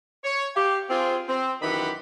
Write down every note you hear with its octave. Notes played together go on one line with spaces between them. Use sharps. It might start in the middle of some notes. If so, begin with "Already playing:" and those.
C#5
G4 F5 G5
C4 F4 G#4
C4
F#2 D#3 E3 G4 F#5 B5